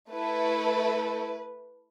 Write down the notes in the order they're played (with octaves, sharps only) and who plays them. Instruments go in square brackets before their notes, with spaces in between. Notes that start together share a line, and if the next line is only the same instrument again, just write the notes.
[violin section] A3 E4 A4 B4